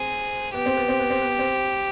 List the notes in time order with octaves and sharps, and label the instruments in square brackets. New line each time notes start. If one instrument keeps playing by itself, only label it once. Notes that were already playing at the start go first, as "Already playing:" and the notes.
Already playing: [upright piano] C4 [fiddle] G#4
[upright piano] B3 [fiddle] G4
[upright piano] C4
B3
C4
B3
C4
B3
C4